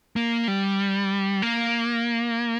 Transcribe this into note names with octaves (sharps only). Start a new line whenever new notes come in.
A#3
G3
A#3